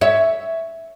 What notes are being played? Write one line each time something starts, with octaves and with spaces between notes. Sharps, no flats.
C#5 E5